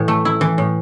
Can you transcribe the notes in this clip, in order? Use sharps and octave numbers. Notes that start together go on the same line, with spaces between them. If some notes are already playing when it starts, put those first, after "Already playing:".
Already playing: A2 E3
A3
E4
E3
A2